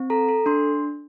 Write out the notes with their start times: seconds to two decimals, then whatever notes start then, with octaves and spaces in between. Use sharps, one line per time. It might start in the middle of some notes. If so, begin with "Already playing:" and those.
Already playing: C4
0.10 A4 A#5
0.28 A4
0.46 D4 C6